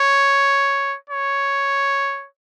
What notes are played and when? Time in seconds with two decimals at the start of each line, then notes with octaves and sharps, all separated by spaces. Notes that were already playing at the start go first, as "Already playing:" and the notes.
Already playing: C#5
1.10 C#5